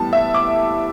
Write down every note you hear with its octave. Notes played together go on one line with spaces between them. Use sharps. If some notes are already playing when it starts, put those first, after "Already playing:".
Already playing: A2 E3 G3 B3 A5
E5
D6